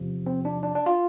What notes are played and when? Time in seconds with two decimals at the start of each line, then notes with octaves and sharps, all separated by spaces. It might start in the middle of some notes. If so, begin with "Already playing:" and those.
Already playing: E2 C3 F3
0.26 C4
0.45 D4
0.63 D4
0.75 D4
0.86 F4